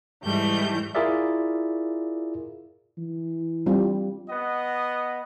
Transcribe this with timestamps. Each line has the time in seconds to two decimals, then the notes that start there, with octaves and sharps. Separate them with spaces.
0.24 G#2 E3 G3 A3 G6
0.95 E4 F4 G#4 A#4 D5 E5
2.98 E3
3.66 G3 C4 F4
4.30 B3 D#5 F#5